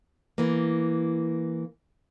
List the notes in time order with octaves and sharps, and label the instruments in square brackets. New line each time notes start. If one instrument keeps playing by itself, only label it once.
[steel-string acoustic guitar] E3 A#3